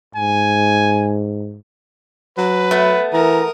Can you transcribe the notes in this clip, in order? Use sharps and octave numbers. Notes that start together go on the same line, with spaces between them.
G#2 G#5
F#3 B4
A3 B3
E3 A#4 A#5 D#6